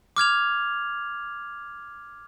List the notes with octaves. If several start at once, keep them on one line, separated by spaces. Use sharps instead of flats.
D6 F6 G#6 F7